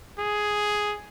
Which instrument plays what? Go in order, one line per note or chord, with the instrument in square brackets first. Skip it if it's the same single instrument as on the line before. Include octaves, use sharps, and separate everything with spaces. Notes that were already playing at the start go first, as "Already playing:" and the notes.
[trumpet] G#4